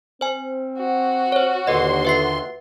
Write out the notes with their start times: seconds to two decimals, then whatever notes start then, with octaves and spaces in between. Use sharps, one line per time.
0.21 C4 C5 G#5
0.79 F#4
1.32 C5 C#5
1.67 D#2 A#2 D3 A4 B4 D#5 C6
2.05 F4 B4 E5 C7